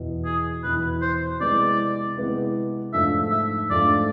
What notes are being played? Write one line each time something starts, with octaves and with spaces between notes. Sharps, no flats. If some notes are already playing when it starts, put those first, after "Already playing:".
Already playing: E2 B2 B3 E4
G#4
E2 B2 B3 E4 B4
C5
C3 G#3 B3 E4 D5
C3 G#3 B3 E4
G#2 F3 A3 D4 E5
E5
G#2 F3 A3 D4 D5